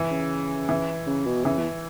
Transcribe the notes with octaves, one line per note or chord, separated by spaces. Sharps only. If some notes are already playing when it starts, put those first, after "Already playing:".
Already playing: E3
C#3
E3
C#3
B2
C#3 E3
E2